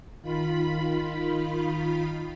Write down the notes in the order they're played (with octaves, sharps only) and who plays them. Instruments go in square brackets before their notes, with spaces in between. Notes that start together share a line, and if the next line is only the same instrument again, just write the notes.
[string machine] D#3 F4 B5